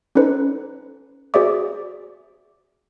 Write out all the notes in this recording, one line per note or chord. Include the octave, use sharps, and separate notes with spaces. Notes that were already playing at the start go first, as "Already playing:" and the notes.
C#4 D#4 A4 B4 C5
F#4 G#4 C5 D5 E5 D6